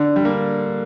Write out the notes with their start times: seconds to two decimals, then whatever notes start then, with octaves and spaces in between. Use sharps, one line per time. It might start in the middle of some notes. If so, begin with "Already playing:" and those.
Already playing: D3 D4
0.16 G3
0.25 A#3